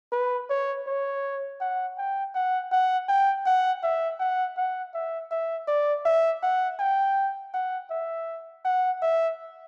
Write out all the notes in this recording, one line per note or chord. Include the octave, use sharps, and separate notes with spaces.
B4
C#5
C#5
F#5
G5
F#5
F#5
G5
F#5
E5
F#5
F#5
E5
E5
D5
E5
F#5
G5
F#5
E5
F#5
E5